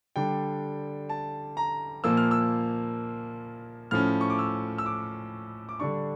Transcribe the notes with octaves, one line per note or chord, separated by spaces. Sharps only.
D3 G3 D4 G5
A5
A#5
A#2 F3 A#3 E6
F6
E6
A2 F3 C#4 F6
C#6
D6
E6
E6
D6
D6
D3 G3 D4 C#6